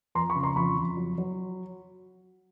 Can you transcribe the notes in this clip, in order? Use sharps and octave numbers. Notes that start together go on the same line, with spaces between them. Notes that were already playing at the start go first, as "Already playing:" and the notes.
F2 A#5 C6
B5 C#6
C#3
A#5 C6
F2 B5 C#6
F2
F#3
F#3